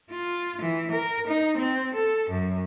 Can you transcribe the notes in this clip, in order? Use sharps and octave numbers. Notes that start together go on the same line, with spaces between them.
F4
E3
A#4
D#4
C4
A4
F#2